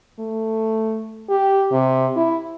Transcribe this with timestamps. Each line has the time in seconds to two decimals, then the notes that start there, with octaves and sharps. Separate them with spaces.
0.19 A3
1.30 G4
1.72 C3
2.16 E4